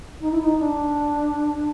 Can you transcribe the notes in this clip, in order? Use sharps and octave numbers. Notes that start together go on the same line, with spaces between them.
D#4
E4
D#4
D4